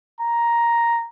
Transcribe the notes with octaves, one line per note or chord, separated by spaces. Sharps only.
A#5